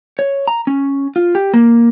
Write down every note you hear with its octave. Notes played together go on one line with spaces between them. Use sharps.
C#5
A#5
C#4
F4
G4
A#3